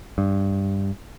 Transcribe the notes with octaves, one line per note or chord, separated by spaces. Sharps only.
G2